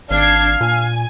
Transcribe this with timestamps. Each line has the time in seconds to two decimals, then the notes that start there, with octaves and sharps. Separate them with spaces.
0.11 G#1 D4 F5 G#6 C7
0.61 A#2 G#5